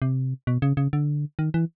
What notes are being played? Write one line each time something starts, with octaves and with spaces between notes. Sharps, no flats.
C3
B2
C#3
C#3
D3
D#3
E3